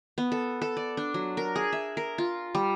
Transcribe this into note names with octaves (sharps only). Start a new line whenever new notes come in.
B3
A4
A4
D5
D4
F#3
A#4
G#4
E5
A#4
F4
G3